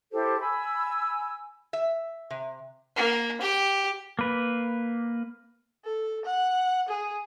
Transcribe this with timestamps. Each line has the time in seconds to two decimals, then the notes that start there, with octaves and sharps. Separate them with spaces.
0.12 E4 G4 A4 C5
0.40 G#5 B5 E6
1.73 E5
2.30 C3
2.96 A#3
3.41 G4
4.19 A#3 B4
5.85 A4
6.25 F#5
6.88 G#4